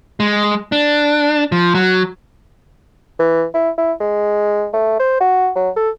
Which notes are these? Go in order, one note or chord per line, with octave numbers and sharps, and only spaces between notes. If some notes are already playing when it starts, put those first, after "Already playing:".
G#3
D4
F3
F#3
E3
E4
E4
G#3
A3
C5
F#4
F#3
A4